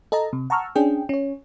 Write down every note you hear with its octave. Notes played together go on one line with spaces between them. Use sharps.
A4 D#5 A5 A#5
C3
F#5 A5 A#5 C#6 E6 F6
C#4 D4 G#4 G5
C#4 C#5